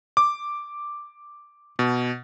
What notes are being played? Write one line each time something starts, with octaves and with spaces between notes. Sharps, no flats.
D6
B2